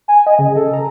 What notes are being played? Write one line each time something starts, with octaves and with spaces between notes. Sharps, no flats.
G#5
D#5
C#3
A4
A#5